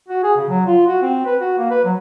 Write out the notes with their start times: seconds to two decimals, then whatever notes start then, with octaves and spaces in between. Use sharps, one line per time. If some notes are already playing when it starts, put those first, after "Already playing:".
0.09 F#4
0.24 G#4
0.37 C#3
0.49 F#3
0.67 F4
0.87 F#4
1.02 C4
1.26 B4
1.41 F#4
1.58 A#3
1.71 B4
1.85 F#3